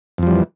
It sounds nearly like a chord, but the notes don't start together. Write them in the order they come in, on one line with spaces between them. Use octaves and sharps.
F2 F3 G3 E3